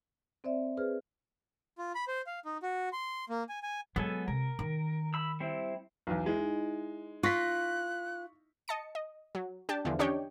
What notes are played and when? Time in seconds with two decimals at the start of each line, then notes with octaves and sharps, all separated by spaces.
0.44 C4 C5 D5 E5
0.77 G#4 B4 C5 F6
1.78 F4
1.95 B5
2.08 C5
2.27 F5
2.45 D#4
2.63 F#4
2.93 C6
3.29 A#3
3.49 G#5
3.63 G#5
3.96 F#3 G#3 B3 A4 G#5
4.28 C3 A#4
4.59 D#3
5.14 B5 E6
5.40 G3 C4 E4
6.07 B1 E2
6.26 G#3 D#4 E4
7.23 F4 C#6 F#6 A#6 B6
8.68 D#5 A5 C#7
8.95 D#5
9.35 F#3
9.69 D4 G4 G5 A5
9.85 E2 D3 E3 F3
9.99 C#4 D4 G4 C#5 D#5 G5